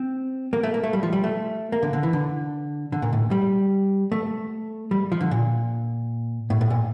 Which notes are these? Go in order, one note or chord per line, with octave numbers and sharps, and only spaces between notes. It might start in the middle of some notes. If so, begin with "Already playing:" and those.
Already playing: C4
A#3
A3
A#3
A3
G3
F3
G3
A3
A#3
D3
D3
E3
D3
D3
A#2
A2
G3
A3
G3
F3
D3
A#2
A2
A2
A#2